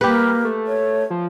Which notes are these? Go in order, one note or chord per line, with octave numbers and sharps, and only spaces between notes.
G3 A#3 G4 B4
A3
C#5
F3